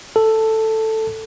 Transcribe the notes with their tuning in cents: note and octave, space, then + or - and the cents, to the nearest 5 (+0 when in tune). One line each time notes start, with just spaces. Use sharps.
A4 +5